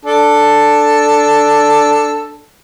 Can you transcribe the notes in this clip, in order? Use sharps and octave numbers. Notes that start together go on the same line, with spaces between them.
D4 A4